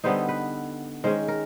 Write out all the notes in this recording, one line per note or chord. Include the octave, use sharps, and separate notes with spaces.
D3 G3 B3 D#4 C5
B4
D#3 G#3 C#4 C5
A#4